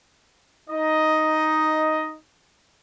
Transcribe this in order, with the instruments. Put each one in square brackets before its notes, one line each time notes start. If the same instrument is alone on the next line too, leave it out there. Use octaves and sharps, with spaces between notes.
[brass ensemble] D#4 D#5